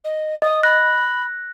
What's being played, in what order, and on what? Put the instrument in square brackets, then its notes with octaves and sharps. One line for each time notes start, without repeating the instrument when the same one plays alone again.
[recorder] D#5
[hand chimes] D#5 [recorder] D#6
[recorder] B5 [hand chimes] F#6 A#6